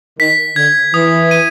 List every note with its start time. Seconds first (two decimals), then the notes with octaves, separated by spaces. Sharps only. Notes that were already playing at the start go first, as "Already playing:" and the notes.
0.19 D#3 B6
0.56 D3 G#6
0.94 E3 D#6
1.31 D#7